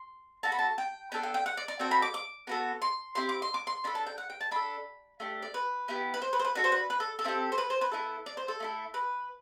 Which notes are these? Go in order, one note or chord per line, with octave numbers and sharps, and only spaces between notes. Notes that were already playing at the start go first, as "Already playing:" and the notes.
Already playing: C6
B3 F#4 A4 A5
B5
A5
G5
B3 D4 A4 G5
G5
G5
F#5
D5
D5
C4 F#4 A4 G5
B5
D6
D6
B3 F#4 A4
C6
C4 E4 G4 C6
D6
C6
D6
C6
D4 A4 B5
A5
G5
F#5
G5
A5
D4 A4 B5
A3 D4 G4
D5
B4
B3 E4 G4
B4
C5
B4
C5
B4
D4 F#4 A4 B4
C5
B4
B4
A4
A4
C4 E4 G4
C5
B4
C5
B4
B3 E4 A4
D5
C5
A4
A3 E4 A4
B4